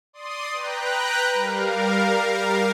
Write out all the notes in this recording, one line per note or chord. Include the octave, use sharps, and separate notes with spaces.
D5 C6 D#6
B4 G5 A#5 F#6
G3 A#4 F5